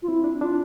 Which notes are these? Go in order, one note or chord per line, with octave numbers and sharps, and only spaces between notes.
F4
C4 E4
D4
D4 F4